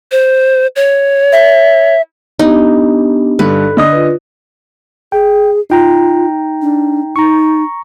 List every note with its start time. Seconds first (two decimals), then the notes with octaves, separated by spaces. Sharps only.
0.12 C5
0.76 C#5
1.32 E5
2.39 B3 D4 D#4 G4
3.39 G2 D3 A4 B4
3.77 D3 D#5 D#6
3.92 F4 B4
5.12 G#4 G5
5.70 D#4 F4 G5 A#5
6.62 D4
7.16 D#4 A#5 C#6